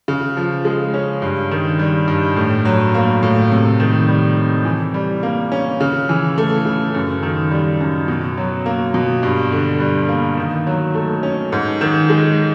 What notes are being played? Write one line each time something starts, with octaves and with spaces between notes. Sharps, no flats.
C#3
F3
G#3
C#4
G2
D#3
G3
G2
A2
F#3
A#3
A2
C3
D#3
G3
C3
E3
G3
A#3
C#4
C#3
E3
A3
C#3
F#2
D#3
G3
F#2
B2
F#3
A#3
B2
G2
D3
G3
A#3
D#3
F#3
A3
C#4
G#2
D#3
G#3